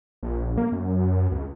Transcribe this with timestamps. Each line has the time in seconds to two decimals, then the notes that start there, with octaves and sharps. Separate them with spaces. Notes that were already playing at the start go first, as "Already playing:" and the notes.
0.23 A#1
0.58 A#3
0.72 F#2
1.31 C#2